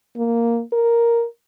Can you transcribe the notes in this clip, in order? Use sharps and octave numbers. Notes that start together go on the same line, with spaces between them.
A#3
A#4